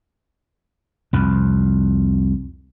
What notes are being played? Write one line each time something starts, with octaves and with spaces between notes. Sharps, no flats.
C2 F2